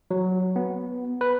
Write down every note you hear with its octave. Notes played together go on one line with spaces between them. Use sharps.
F#3
B3
B4